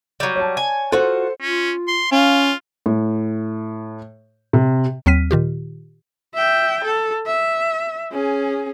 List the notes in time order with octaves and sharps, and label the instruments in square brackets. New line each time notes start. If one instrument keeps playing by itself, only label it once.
[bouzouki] F#3 G3
[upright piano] C#5 A5
[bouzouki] G#5
[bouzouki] F4 F#4 [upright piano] A4 C5
[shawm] C#4 [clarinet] F4
[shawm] C6
[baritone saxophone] C#4 [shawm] F4 [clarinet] F5
[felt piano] A2
C3
[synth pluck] D#2 F#3 C4 F6 B6 D#7
A#2 D#3 F4 G4
[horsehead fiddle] E5 G5
A4
E5
C#4 G#4